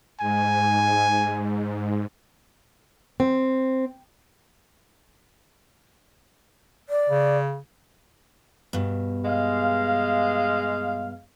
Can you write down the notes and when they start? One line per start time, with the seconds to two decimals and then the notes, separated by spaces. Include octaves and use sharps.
0.20 G#2 G#5
3.20 C4
6.89 D5
7.09 C#3
8.73 G2 B2
9.25 G#3 F5